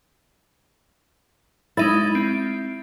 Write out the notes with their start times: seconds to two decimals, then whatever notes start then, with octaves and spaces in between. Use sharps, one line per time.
1.77 G#3 D#4 E4 A6
2.15 C4 D7